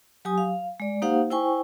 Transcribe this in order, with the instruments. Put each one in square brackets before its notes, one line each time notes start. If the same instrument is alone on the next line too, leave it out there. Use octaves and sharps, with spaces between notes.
[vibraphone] F#3 G4 G#5 D#6
F5
G#3 D5
A#3 D#4 G4 C5 F5 F#5
E4 C5 G5 G#5 C#6